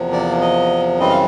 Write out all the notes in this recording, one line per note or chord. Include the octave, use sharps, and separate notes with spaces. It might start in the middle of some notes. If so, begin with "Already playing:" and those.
Already playing: E2 C3 F3 A#3
D5
D#5
F#2 C#3 E3 G3 C4 D#5
F5